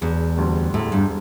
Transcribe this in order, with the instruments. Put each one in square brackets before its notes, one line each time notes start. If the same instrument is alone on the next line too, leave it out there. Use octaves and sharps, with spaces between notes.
[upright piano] E1 [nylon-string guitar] E2
[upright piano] D2 D3 G3
[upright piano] E1 [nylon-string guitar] A2
[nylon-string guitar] G2